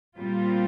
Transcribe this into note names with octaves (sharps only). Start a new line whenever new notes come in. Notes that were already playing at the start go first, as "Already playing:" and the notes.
A#2 G3 C4 F4